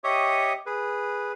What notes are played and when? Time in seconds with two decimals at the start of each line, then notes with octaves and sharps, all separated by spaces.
0.04 G4 C#5 D#5 E5 C#6 D#6
0.66 G#4 B4